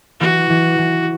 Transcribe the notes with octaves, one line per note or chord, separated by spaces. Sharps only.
E3 F#4
E3
E3